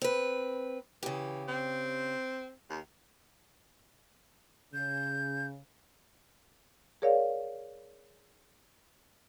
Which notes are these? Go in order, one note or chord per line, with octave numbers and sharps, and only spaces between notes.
C4 B4
C#3 E3 G4
C4
D#2
C#3 G6
G#4 A#4 C#5 D5 F5